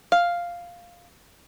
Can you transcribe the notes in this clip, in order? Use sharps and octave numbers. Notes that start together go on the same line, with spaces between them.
F5